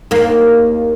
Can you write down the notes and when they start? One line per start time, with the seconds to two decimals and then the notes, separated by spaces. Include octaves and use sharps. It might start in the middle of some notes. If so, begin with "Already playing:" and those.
0.11 D#2 A#3